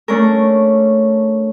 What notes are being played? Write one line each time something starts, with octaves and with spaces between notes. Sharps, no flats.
A3 C#4 D4 A4 A#4